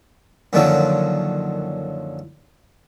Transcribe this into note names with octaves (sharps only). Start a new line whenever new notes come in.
F#2 A#2 D3 D#3 F3 F#3